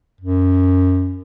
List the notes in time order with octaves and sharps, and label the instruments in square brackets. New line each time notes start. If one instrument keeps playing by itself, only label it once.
[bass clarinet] F#2